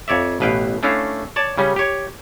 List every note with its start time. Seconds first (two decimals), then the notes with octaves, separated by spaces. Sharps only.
0.08 F2 C#5 D5 E5
0.40 A1 B2 B4 F5 G5
0.83 A3 C#4 D4 E4 F5
1.36 C#5 D5 A5
1.58 C#3 G3 C#4
1.76 G4 C#5